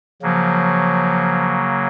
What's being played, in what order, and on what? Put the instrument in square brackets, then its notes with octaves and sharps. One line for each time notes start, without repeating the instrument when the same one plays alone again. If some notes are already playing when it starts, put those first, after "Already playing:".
[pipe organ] C#3 F#3 A#3 [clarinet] F3